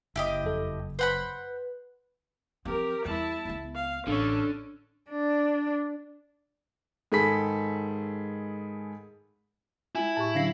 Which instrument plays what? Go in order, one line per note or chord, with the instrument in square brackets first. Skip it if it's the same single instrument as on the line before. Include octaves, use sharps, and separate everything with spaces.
[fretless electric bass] F#1 [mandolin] E4 G4 D#5
[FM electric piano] F2 A4
[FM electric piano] B4 [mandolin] C5 F#5 B5
[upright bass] F3 C4 [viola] G4 A#4
[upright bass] E2 G3 [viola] E4 A5
[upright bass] C#2 B3
[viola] F5
[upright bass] A1 [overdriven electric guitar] D3 [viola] C#4 A4
[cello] D4
[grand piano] G#2 D#3 G#4 A4 B5 B6
[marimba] G#3 F4 [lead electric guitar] E4 [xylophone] G#5
[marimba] A2 G4 C#6 [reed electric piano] A5
[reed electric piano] D3 C#4 [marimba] F#3 D4 [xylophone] F5 A#6 C7